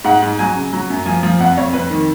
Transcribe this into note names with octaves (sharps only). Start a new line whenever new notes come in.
G#2 F#5
G#2
F#3 G#5
C#3
F#3
F#2
F3 G#5
F3
F2 F#5
F2 C#5
F2 B4
D#3